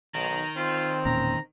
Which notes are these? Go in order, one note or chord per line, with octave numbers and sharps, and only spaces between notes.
B1 D#3 A#5
C4 F4
E1 A#2 C#4 A#5